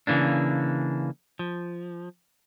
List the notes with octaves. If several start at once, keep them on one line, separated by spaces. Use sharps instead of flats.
C#3 E3 A#3 D4
F3